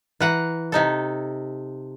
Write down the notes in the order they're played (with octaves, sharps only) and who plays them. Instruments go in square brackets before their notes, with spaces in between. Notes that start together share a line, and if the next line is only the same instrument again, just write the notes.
[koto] E3 F#5 A#5
C3 D#4 A4